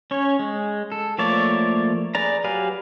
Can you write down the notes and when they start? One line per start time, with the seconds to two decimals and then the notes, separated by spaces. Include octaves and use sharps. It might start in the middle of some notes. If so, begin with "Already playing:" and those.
0.11 C#4 C#5
0.39 G#3
0.92 A4
1.18 F3 A3 A#3 C#5 D5
2.15 G#4 B4 D5 A#5
2.44 F#3 G4 B4 F5 G#5